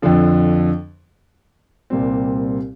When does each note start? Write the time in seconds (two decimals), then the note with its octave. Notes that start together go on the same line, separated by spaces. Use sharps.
0.02 F2 D3 F3
1.90 C2 A#2 G3 C4